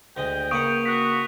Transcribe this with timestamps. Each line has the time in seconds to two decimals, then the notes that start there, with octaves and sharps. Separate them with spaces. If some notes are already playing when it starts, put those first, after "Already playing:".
0.17 D2 G#3 D#5 G5
0.51 C#3 A#3 B4 F#5 C#6 D#6 D7
0.85 F#4 F#6 B6